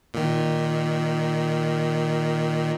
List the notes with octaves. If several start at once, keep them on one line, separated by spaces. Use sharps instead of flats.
A#2 D#3